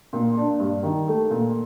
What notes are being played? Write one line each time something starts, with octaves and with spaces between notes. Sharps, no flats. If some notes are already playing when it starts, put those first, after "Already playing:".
A#2
D4
G2
D#3
A3
A#2